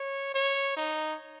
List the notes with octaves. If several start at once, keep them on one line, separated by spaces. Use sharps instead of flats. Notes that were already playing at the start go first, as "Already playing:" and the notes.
Already playing: C#5
C#5
D#4